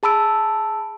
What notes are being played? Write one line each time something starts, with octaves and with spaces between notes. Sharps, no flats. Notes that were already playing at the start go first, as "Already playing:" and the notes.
G#4 A5 B5 E6 D7